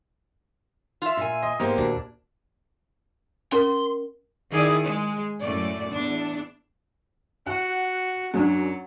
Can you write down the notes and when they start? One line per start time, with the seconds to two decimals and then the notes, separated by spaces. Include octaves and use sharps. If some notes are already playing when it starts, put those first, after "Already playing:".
1.02 F4 E5
1.17 A#2 G#5
1.43 D#5 C6
1.60 G#2 F3 A#3 B3 G4 C5
1.78 D#2 A#2 D4 F#4
3.52 C#4 A#4 C6
4.51 D#3 E4 G#4 D5
4.82 G#3
5.39 F#2 A2 A3 D5
5.91 E2 D4
7.46 F#4 F#5
8.34 F#2 F#3 D4